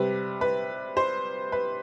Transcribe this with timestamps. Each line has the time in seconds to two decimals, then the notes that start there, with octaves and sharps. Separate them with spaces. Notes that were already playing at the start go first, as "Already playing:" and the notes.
Already playing: C3 G3 B4
0.41 B4
0.97 C5
1.52 B4